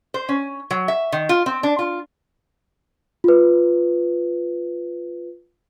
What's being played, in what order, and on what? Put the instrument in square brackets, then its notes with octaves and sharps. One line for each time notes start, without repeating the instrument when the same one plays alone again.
[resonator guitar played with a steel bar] C5
C#4
F#3
E5
D#3
F4
C4
D4
F4
[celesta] F4 B4